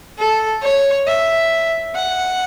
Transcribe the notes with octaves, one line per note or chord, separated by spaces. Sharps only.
A4
C#5
E5
F#5